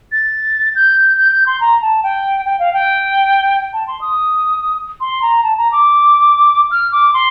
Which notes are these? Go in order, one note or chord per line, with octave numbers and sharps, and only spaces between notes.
A6
G6
G6
G6
C6
A#5
A5
G5
G5
F5
G5
A5
C6
D#6
C6
A#5
A5
A#5
D6
F6
D6
C6